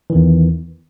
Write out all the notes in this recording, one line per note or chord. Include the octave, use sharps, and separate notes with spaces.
E2 D#3 E3